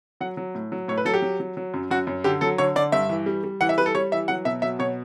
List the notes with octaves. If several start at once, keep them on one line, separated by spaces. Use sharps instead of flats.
F#3 F#5
F#3
A2
F#3
A2 C#5
B4
F#3 A4
G4
F#3
F#3
F#3
F#2
F#2 F#4
F#2
D3 G4
F#3 A4
D3 C#5
D3 D5
G2 E5
E3
G3
G3
E3 F#5
E5
G3 B4
A4
G3 C#5
E3 E5
F#3 F#5
B2 E5
F#3 E5
B2 C#5